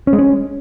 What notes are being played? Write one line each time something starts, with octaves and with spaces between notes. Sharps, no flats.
C#4
G#3
C#4